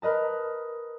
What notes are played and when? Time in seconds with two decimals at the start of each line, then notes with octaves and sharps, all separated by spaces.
0.02 A#4 B4 D#5 A5